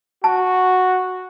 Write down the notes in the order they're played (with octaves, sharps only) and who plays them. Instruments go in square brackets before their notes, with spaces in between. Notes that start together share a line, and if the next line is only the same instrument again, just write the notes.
[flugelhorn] F#4 [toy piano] A5